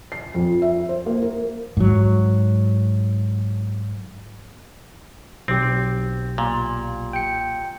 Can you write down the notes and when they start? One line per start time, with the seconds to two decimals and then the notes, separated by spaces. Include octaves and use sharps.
0.12 C7
0.34 F2
0.62 E5
0.89 C5
1.06 A#3
1.22 A#4
1.77 G#2 F#3
5.48 B1 C4 G4
6.38 A#2
7.13 G5 C#7